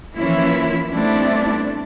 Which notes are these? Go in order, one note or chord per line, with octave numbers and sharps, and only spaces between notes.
E3 F3 A#3 C#4 E4
G3 A3 B3 C4 D4 E4